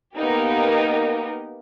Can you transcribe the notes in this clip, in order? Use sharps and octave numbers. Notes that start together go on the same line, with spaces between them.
A#3 B3 D#4 G4 A#4